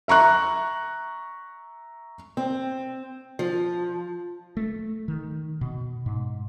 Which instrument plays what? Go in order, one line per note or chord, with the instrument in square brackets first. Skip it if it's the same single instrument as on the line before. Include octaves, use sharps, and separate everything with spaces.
[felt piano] E5 A#5 C#6 F#6
[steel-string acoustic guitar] C4
F3
[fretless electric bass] A3
D#3
B2
G#2